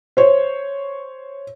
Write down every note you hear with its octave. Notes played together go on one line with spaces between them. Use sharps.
C5 C#5